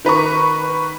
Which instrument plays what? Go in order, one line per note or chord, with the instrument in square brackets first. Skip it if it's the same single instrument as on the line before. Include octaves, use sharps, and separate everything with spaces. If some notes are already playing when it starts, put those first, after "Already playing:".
[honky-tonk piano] D#3 B4 A#5 C#6